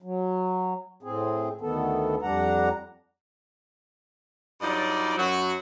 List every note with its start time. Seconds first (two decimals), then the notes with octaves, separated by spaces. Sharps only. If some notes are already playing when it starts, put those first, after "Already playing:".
0.02 F#3
1.03 A2 C4 G#4
1.61 D2 D#3 B3 A4
2.22 F2 G3 D4 F#5 A#5
4.61 G2 F#3 D#4 F4 D5
5.17 F#2 F#3 F#4